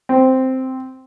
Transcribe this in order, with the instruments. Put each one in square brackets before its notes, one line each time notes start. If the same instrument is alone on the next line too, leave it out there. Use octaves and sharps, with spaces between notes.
[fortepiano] C4